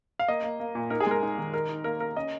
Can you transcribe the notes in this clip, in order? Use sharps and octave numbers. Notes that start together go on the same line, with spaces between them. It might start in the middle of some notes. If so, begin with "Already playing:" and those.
F5
A#3 D#5
A#3
A#3
A#2
D#4 A#4
G#4
G#3 A#4
D#4
D#3
D#4 A#4
D#4
A#3 A#4
A#3 A#4
C#4 D#5